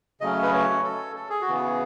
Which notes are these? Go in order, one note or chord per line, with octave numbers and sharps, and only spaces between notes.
C#3 F#3 A3 C#4 D#5
B4
C#5
A4
A4
G#4
F#4
C#3 E3 B3
G#4